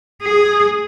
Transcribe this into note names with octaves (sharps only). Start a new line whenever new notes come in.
G#4